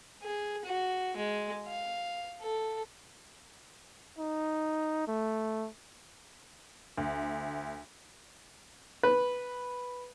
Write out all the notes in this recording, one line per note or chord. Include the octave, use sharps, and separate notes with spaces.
G#4
F#4
G#3
F5
A4
D#4
A3
D2
B4